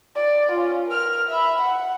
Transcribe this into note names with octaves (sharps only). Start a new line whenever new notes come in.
D5
C#4 F4
A#4 F6
E5 B5
F#5